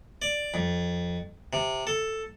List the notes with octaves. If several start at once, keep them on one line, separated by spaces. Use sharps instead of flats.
D5
F2
C3
A4